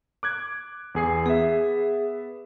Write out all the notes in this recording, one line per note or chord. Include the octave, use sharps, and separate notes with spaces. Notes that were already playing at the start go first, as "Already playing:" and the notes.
D6 F#6 G#6
E2 G#4 C7
B3 G#4 E5